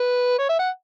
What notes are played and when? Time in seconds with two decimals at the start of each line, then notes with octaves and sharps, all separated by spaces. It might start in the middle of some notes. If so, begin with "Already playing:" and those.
Already playing: B4
0.38 C#5
0.49 E5
0.59 F#5